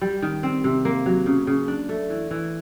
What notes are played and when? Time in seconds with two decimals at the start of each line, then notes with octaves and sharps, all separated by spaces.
0.01 G3
0.22 D#3
0.43 C4
0.64 C3
0.85 A#3
1.06 F#3
1.26 C#3
1.47 C#3
1.68 D4
1.89 A3
2.10 E3
2.31 E3